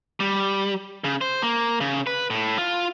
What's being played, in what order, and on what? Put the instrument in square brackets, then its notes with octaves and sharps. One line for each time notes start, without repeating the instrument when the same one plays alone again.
[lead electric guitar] G3
C#3
C5
A#3
C#3
B4
A2
F4